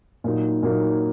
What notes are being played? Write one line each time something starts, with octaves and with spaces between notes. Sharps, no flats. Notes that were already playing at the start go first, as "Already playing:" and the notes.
A#2 F#3 A#3 D#4
A#2 F#3 A#3 D#4